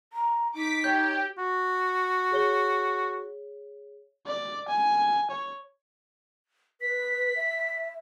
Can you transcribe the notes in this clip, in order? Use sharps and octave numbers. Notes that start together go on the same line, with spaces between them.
A#5
D#4 D6 B6
G4 C#5 G6
F#4
G#4 C#5 G7
D5
G#5
C#5
B4 B6
E5